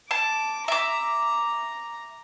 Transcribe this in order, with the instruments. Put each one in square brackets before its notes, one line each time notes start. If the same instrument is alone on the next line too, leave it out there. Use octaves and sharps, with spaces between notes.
[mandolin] A5 [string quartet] D6
[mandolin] E5 D6 [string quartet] A#5